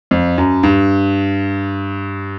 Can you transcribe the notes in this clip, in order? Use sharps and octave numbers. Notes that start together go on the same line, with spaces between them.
F2
F#2
G2